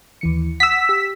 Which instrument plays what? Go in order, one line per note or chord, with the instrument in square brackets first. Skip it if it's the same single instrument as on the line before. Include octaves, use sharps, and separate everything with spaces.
[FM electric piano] D#2 E3 C#7
[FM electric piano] F#5 D#6 [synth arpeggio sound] E6 B6
[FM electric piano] G4